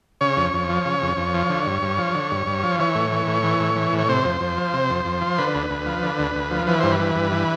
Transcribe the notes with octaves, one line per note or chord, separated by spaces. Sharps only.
C#3 C#5
F2
F2
F3
C#3
F2
F2
F3
D3
G2
G2
F3
D3
G2
G2
F3
E3 C#5
A2
E3
A2
E3
A2
E3
A2
C#5
C3 C5
F2
F2
F3
C3
F2
F2
F3
D3 B4
D2
D2
F3
D3
D2
D2
F3
E3 B4
G2 C5
B4
E3
G2
E3